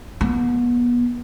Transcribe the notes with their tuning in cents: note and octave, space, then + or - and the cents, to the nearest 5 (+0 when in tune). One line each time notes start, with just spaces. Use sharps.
B3 -30